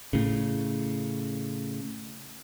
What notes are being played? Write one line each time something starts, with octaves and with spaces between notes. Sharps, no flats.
A2 C#3